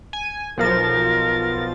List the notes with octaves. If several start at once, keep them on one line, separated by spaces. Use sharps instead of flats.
G#5
B1 F3 A#4 A6